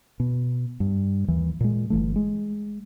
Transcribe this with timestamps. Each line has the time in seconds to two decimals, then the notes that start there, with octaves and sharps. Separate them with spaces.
0.20 B2
0.80 G2
1.28 D#2 E3
1.60 A#2 G#3
1.90 G1 C#2 E3 A3
2.16 G#3